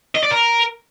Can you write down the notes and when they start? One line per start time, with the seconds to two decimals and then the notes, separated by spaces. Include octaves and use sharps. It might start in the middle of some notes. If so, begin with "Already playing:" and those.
0.15 D#5
0.23 D5
0.31 A#4